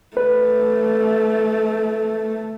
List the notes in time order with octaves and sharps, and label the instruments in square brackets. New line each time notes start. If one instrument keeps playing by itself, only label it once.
[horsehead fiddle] A3 [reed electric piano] B4